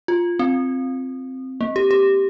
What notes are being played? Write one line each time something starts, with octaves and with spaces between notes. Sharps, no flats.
F4
C4
A#3
G4
G4